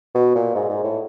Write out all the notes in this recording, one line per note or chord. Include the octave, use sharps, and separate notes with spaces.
B2
A#2
G#2
G#2
A2